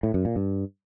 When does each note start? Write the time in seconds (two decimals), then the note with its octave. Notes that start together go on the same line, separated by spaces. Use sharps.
0.03 A2
0.14 F#2
0.25 A#2
0.36 G2